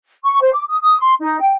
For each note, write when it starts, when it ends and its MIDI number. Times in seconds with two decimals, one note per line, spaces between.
0.24 0.40 85
0.41 0.50 72
0.53 0.63 86
0.69 0.77 87
0.81 1.00 87
1.00 1.13 84
1.20 1.38 63
1.40 1.53 79